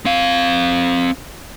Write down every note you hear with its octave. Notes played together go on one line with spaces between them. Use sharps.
C4 F5